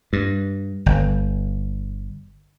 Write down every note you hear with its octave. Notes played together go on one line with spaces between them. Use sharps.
G2
G1